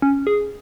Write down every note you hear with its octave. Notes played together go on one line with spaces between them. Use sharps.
C#4
G#4